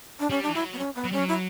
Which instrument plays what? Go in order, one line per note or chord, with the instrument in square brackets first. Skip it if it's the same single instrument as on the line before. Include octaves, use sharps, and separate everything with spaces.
[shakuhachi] D4
[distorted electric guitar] G3 [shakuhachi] C#4
[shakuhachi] D4
[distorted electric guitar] E3
[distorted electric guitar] F#3 [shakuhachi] E4
[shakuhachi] B3
C#4
B3
[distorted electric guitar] F#3
[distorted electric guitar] G3 [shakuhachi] C#4
[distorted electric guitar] F#3
[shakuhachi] E4